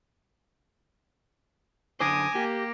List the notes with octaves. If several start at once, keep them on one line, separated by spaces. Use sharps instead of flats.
F#2 D3 C5 G#5 D6 D#6 A#6 D7
A#3 G4